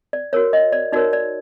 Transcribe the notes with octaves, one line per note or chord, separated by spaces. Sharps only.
D5
F#4 A#4 C#5
D#5
D5
D#4 F#4 A#4 C#5 D5
D5